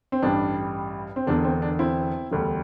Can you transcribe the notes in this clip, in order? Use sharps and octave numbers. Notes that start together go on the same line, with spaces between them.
C4
A1 G2 G3 D4
C4
E1 E2 D3 D4
C4
D4
C4 E4
E1 D2 D3 G3